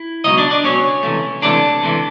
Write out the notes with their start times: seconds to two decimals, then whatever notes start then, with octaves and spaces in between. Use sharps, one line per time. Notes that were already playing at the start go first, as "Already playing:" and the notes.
Already playing: E4
0.24 C#2 B2 F#3 D#4 D#5
0.38 D4 D5
0.50 D4 D5
0.63 C#2 B2 F#3 C#4 C#5
1.03 C#2 C3 E3 A3
1.42 C#2 C3 E3 A3 D4 D5
1.82 C#2 C3 E3 A3